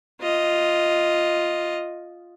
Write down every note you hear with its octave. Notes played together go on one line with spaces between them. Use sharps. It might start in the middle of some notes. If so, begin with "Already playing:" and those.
F4 D#5